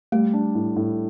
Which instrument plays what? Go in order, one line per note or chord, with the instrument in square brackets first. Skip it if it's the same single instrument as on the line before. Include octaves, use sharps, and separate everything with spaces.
[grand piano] G3 [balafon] A3
[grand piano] D4
A2
A2